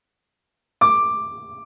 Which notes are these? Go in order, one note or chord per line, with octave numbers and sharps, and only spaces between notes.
D6